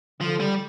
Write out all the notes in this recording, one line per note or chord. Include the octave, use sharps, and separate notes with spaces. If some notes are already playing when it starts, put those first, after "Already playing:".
D3 F3
G3